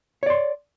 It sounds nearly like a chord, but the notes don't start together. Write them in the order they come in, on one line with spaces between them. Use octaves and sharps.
C#5 D5 C6